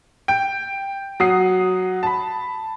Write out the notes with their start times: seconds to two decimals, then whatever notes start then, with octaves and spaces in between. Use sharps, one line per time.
0.28 G5
1.20 F#3 F#5 D#6 C7
2.03 A5 B5